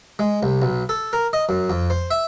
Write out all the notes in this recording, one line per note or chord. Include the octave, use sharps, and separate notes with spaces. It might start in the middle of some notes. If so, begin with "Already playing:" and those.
G#3
C2
B1
A4
A#4
D#5
F#2
F2
C5
E5